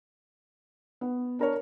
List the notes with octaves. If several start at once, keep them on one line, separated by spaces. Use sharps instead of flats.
B3
D4 A#4 C#5